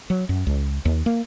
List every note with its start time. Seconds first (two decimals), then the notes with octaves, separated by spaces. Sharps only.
0.10 F#3
0.29 F#2
0.47 C#2
0.85 D#2
1.06 A#3